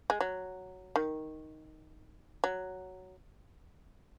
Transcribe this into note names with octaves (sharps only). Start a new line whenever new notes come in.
G#3
F#3
D#3
F#3